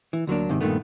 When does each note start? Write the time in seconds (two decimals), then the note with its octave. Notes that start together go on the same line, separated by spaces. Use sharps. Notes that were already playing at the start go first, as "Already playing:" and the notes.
0.13 E3
0.27 D2 F#3 A#3 D4
0.49 G#2 C3 D#3
0.61 G2 A#2 D#3 A3 B3